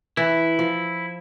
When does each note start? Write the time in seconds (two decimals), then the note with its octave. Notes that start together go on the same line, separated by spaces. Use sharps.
0.17 E3 E4
0.59 F3